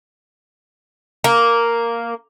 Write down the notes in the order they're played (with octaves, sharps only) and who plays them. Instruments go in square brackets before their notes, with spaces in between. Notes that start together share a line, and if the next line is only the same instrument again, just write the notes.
[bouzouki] A#3